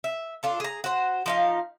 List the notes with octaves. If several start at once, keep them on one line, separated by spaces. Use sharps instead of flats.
E5
D4 F4 A4
G#4 A#5
F#4 C5
F3 D#4 F5